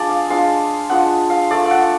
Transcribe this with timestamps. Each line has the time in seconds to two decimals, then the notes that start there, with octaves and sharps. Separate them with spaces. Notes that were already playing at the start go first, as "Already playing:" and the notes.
Already playing: G#3 D4 F4 D5
0.09 F5
0.30 G#3 D4 F4 F5
0.90 G#3 D4 F4 F#5
1.30 F5
1.51 A3 F4 D5
1.65 F5
1.71 F#5